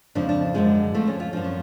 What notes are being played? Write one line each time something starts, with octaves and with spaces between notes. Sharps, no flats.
F2 C#3 F3 D4
D4
F#2 D3 F3 G#3
F2 F3 A3
C#4
F4
F#2 F3 D4
C#4